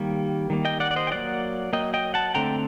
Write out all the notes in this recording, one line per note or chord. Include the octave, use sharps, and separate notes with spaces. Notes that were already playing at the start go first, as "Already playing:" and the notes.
Already playing: D#3 G3 A#3
D#3 G3 A#3
D#5 G5
D5 F#5
D5
C5 D#5
G5
F#3 A#3 D5 F#5
F#3 A#3 D#5 G5
D#5 G5
F#5 A5
D3 A3 C4 G5 A#5